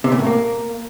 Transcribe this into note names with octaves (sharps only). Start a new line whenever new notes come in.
C3
A#2
A2
A#3